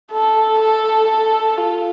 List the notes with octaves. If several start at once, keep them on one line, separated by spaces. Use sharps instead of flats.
A4
A4
A4
F4